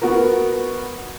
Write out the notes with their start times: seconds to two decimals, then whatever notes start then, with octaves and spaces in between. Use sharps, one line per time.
0.02 B3 F#4 A#4